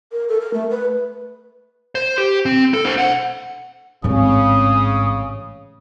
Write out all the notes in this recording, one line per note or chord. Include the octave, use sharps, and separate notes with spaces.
A#4
A4
A#4
A3
B4
C5
G4
C4
A4
D4 C5
B1 F#5
A1 G#2 C#3 G#3 C4 D#6